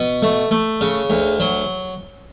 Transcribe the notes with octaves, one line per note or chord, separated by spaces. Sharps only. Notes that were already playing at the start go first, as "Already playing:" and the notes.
Already playing: B2
A3
A3
C#3
D2
F#3